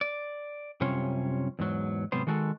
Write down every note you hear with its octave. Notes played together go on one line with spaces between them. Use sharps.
D5
F#2 C3 G3 C#4 F4 C#5
E2 G#2 F#3
G#2 C3 F#3 B3 C5
D#3 G#3 F#4 A4